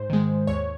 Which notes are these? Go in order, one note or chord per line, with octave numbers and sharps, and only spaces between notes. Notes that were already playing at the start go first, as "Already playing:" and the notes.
Already playing: G#2 C5
D#3 G#3
D#2 C#5